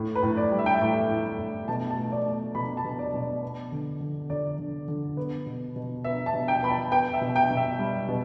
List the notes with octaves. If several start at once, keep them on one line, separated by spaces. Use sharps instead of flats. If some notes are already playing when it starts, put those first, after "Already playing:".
Already playing: A2
B4
A2
D5
G3
E5
G5
E5
A2
A2
A2
B2 A5
A5
A3
D5
A3
B2 B5
A5
B2
D5
B2
D5
B3
D3
D3
D3 D5
D3
D3
B3
B2
B2
B3 E5
A5
B2
G5
B3 B5
A5
B3 G5
E5
B2
G5
B2
E5
G3
B2